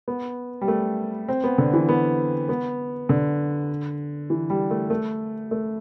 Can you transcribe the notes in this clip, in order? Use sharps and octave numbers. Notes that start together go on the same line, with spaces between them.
B3
G3
A3
C4
B3
D3
E3
B3
B3
D3
E3
G3
A3
A3
A3